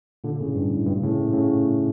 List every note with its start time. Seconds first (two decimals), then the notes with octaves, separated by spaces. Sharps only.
0.24 A#2 D3
0.40 A2 C#3
0.55 G2
0.71 A2
0.86 G2 A#2
1.02 A2 C#3
1.33 A2 C#3